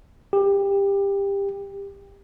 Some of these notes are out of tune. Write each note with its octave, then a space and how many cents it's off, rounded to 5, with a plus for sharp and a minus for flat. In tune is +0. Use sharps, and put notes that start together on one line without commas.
G4 +20